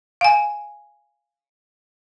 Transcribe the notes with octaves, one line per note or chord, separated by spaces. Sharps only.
F5 G#5